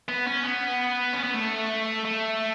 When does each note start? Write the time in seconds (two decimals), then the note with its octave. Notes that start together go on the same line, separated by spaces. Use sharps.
0.08 B3
0.27 C#4
0.44 B3
1.13 C#4
1.23 B3
1.34 A3
2.05 A3